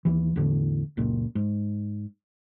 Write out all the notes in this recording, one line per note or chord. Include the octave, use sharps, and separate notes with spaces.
D#2 E3
E2 A2 D3
F#1 C#2 A#2
G#2